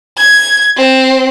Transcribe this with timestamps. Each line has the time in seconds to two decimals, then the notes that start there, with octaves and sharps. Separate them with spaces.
0.17 G#6
0.77 C4